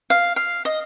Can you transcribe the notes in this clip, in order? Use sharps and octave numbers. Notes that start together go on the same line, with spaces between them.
F5
F5
D#5